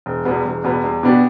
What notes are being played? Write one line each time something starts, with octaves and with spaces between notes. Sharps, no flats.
E1
E2 B2 G3 B3
E1
E2 B2 G3 B3
E2
B2 B3 D4 G4